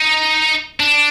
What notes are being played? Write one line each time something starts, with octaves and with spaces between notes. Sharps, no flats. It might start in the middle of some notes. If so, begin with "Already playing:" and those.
Already playing: D#4
D4